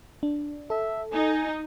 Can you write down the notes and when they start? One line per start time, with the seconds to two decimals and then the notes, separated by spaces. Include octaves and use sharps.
0.23 D4
0.70 A4 E5
1.12 D#4 G#5